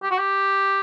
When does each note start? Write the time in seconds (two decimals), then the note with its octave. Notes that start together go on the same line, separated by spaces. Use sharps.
0.03 G4
0.11 F#4
0.18 G4